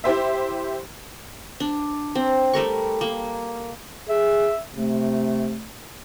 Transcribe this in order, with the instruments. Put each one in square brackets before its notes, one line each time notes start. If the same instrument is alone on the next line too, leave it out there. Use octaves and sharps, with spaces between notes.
[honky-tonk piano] E4 G4 C5 E5
[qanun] D4
C4
G3 A3 A#4 C#6
A#3
[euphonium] G#4 [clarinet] E5
[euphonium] C3 [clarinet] A3